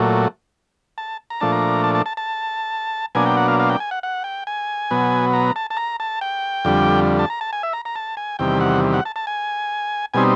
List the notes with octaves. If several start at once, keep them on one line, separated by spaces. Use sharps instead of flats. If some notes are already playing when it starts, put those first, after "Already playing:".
Already playing: A#2 F#3 A3
A5
A#5
A#2 F3 A3 D4 A5
A#5
A5
A5
A5
A5
B2 F#3 A#3 D4 G#5
G5
F#5
F5
F5
G5
G#5
F#5
F#5
G5
G#5
B2 F#3 B3
A#5
A5
A5
A#5
A5
G5
F2 D3 G3
A5
A#5
A5
G#5
E5
A#5
A#5
A5
G#5
E2 C3 D#3 G3 G5
F#5
F#5
A5
A5
G#5
B2 G3 C4 D#4 G#5